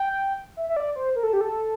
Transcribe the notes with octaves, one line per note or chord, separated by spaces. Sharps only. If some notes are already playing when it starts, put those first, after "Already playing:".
Already playing: G5
E5
E5
D5
C5
A#4
A4
G4
A4